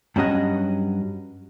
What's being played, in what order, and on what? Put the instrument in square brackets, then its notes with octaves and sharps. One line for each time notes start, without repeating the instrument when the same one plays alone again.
[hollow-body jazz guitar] G2 F#3 C#4 F#4 D#5 F#5